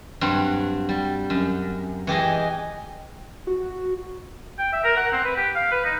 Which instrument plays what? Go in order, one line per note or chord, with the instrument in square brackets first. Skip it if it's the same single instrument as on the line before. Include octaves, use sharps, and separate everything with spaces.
[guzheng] G2 F#3 C4
G3
F#2
E3 G4 G#4 D#5
[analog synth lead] F#4
[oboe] G5
E5
A#4
F#5
C4
B4
G4
F5
B4
D#4